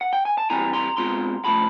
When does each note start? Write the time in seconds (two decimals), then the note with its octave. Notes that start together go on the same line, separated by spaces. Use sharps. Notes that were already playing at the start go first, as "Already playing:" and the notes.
0.01 F#5
0.13 G5
0.25 G#5
0.38 A5
0.50 E3 G3 C4 E4 G#5 A#5
0.73 A#5 C6
0.97 B2 G#3 C4 F4 A#5 C6
1.44 C#3 F3 A3 A5 B5